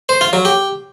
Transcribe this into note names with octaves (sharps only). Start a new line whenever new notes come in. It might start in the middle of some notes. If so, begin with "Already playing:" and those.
C5
F4
F#3
G4